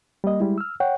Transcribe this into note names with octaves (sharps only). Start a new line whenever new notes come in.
G3 A#3 D#5
G3 G#3 E4
E6 F6
C#5 F#5 G5